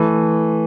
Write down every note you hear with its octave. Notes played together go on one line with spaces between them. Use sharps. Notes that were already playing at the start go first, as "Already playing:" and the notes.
Already playing: E3 A3